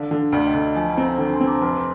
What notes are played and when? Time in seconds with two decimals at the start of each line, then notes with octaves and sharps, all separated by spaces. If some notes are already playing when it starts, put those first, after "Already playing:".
Already playing: D3 D5 F5
0.11 D3
0.32 D2 D5 F5
0.47 D#5 G5
0.54 D2
0.62 D#5 G5
0.75 F3 F5 G#5
0.97 C4 G5 A#5
1.18 D3
1.33 G#5 C6
1.41 C4
1.47 A#5 D6
1.61 F1 G#5 C6